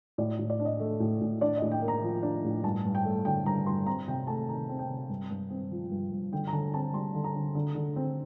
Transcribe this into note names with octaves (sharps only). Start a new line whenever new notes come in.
A2 D5
A2
D5
D4
D#5
A3
A2
A2
D4 D5
A2 D#5
G5
A#3
A#5
F3
D4
A2
G2 A5
G2
G5
A3
D3 G5
G2 A#5
G2 C6
C4 A#5
C3 G5
A3 A5
D#3 A#5
C4
G5
C3
G2
G2
C4
F3
G2
G2
D3 G5
A#5
D3 A5
C4 A5
G3 C6
D3
A#5
D3
D3
D3
C4